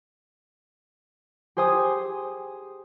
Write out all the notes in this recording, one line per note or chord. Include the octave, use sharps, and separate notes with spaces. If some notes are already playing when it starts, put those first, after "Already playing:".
G4 G#4 C5 G#5 D#6